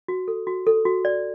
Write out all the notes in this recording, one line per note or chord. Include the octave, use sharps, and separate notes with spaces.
F#4
A4
F#4
A4
F#4
D5